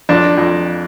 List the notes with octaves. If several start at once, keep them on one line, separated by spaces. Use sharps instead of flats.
F2 D4
F2